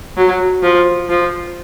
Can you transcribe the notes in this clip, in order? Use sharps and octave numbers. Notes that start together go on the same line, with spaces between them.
F#3
F3
F3